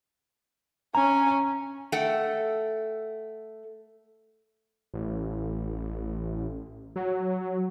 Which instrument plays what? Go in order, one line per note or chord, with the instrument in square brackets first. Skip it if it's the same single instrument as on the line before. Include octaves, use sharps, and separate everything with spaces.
[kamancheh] C#4 G#5 [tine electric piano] A#5
[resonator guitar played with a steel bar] A3 A4 F#5 G5
[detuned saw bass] A1
F#3